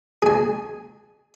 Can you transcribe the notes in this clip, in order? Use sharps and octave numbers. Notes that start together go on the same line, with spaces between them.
G#4 G#5